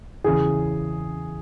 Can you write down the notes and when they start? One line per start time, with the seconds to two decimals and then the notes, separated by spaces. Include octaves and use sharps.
0.24 E2 C#3 E3 G#4